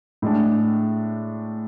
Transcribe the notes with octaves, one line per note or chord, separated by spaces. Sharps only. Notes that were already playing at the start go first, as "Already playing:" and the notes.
A2 G#3 D4